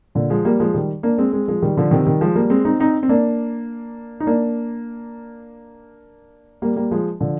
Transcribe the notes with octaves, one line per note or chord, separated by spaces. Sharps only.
A#2 D3
F3 G#3
G3 A#3
F3 G#3
D#3 G3
A#3 D4
G#3 C4
G#3 C4
F3 G#3
D#3 G3
D3 F3
C3 D#3
D#3 G3
F3 G#3
G3 A#3
G#3 C4
C4 D#4
C4 D#4
C4
A#3 D4
D#4
A#3 D4
G3 A#3
G3 A#3
F3 G#3
D3 F3